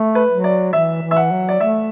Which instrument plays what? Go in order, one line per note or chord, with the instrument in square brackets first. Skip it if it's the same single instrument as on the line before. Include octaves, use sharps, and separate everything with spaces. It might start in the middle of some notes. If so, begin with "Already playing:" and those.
Already playing: [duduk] A3
[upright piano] B4
[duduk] F#3
[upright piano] D5
[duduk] E3 [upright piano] E5
[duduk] E3
[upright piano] E5
F#5
[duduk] F#3
[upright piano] D5
[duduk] A3 [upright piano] E5